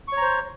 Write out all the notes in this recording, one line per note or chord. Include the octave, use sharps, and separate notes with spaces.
C5 C#5 A#5 C#6